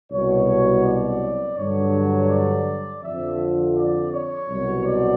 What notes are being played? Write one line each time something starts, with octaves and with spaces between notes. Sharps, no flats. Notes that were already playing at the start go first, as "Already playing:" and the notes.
C2 B2 F#3 C#5
D5
G2 D3 F#3 C#5
D5
F2 D3 F3 E5
D5
C#5
C2 B2 F#3
D5